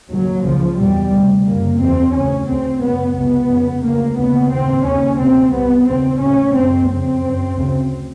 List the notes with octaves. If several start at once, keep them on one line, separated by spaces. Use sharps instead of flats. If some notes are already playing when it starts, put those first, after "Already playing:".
D#2 C#3 F#3
C#2 C#3 F3
E2 B2 G3
D2 C3
F#2 C#3 A#3
E2 B2 C4
D2 C#3 C#4
D2 C#3 C4
F#2 C#3 B3
C#2 C3 B3
F2 C#3
D2 C#3 A#3
D#2 C#3 B3
D#2 C#3 C4
D#2 C#3 C#4
D2 C3 C4
C2 C3 B3
D#2 C#3 C4
D2 C#3 C#4
F#2 C#3 C4
F2 C#3 C4
F#2 C#3
D2 C#3